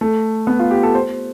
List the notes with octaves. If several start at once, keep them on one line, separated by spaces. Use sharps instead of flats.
A3
B3
F4
G4
A4
C5